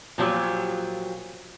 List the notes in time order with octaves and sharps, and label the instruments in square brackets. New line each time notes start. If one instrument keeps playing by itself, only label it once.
[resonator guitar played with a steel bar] A#2 F3 F#3 G4